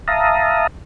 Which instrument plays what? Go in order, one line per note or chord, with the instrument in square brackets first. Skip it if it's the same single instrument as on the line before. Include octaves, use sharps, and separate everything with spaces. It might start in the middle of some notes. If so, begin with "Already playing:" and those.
[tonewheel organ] E5 F5 A5 A#5 D#6